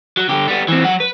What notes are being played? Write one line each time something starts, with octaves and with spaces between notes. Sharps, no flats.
F#3
D3 G4
G3 B3
E3 C4
F#3 F#5
B4